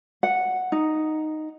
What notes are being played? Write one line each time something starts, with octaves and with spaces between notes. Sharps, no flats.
F#5
D#4